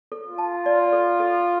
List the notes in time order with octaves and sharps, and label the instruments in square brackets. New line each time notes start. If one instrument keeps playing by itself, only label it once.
[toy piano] A4
[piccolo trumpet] F4
[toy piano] A5
D5
A4
A4